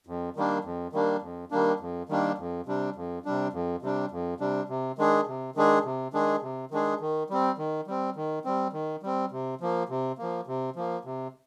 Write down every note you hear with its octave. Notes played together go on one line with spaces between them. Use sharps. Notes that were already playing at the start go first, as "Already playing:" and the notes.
F2
D#3 G3 A#3 D4
F2
D#3 G3 A#3 D4
F2
D#3 G3 A#3 D4
F2
D#3 G3 A#3 D4
F2
C3 G3 D4
F2
C3 G3 D4
F2
C3 G3 D4
F2
C3 G3 D4
C3
D#3 G#3 D4 G#4
C3
D#3 G#3 D4 G#4
C3
D#3 G#3 D4 G#4
C3
D#3 G#3 D4 G#4
D#3
G3 C4
D#3
G3 C4
D#3
G3 C4
D#3
G3 C4
C3
F3 A#3
C3
F3 A#3
C3
F3 A#3
C3